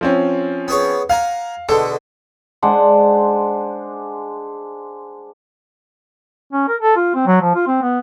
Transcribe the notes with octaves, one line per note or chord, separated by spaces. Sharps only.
F3 C4 C#4
B3 G#4 C#5
F5 F#5 G#5 A#5
B2 D3 G#3 A4
G#3 D4 C5 F#5
C#4
A#4
A4
F4
C4
F#3
F3
F4
C4
B3